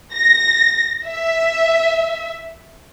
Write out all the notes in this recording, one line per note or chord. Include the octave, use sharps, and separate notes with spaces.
A#6
E5